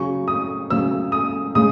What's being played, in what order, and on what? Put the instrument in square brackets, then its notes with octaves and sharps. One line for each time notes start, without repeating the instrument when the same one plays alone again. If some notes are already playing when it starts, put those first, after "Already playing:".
Already playing: [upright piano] C#3 F#3 C#4 C#6
D#6
C#3 F#3 C#4 E6
D#6
C#3 G#3 D#6